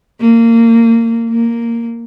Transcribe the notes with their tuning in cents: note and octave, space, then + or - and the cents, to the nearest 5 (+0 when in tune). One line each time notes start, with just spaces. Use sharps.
A#3 -25
A#3 -5